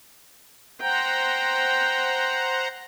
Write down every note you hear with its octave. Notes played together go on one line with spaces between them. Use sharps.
C5 F#5 G5 A#5